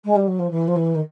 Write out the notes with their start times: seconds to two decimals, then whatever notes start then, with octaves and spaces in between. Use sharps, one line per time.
0.04 G#3
0.15 G3
0.27 F#3
0.39 F3
0.50 E3
0.67 F3
0.75 E3
0.94 D#3